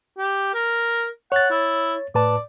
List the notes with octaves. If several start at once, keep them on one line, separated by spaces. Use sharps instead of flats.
G4
A#4
C#5 F#5 A6
E4
A2 B4 D5 A5